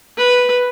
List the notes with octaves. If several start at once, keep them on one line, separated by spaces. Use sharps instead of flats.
B4